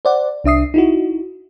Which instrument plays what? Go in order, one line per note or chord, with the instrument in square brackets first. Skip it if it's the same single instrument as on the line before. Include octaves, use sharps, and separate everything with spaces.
[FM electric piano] C5 D5 F#5
C2 D4 E5 D#6 C7
D#4 E4 F#4